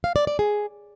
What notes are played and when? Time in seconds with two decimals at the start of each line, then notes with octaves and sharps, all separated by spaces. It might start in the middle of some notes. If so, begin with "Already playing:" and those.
0.04 F5
0.16 D5
0.27 D5
0.39 G#4